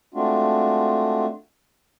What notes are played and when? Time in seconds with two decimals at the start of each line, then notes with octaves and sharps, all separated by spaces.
0.14 G#3 A3 C4 D4 F4 F#4